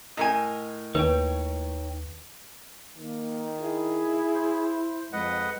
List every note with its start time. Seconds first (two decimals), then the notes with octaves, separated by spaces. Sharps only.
0.17 A2 A#4 D#5 G#5
0.95 D#2 D#4 B4 C#5 G5
2.97 D#3 A#3
3.61 E4 G#4
4.34 C5
5.13 F2 G#3 B4 D#5 F#5